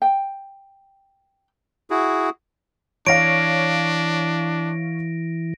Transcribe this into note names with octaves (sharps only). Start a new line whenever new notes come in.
G5
E4 F#4 G#4
E3 D4 C#5 F5 A#6 D7